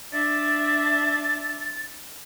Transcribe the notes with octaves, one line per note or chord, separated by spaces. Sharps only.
D4 E5 A6